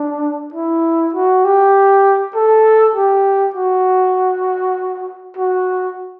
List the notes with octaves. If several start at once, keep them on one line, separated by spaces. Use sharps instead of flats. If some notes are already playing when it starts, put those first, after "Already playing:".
Already playing: D4
E4
F#4
G4
A4
G4
F#4
F#4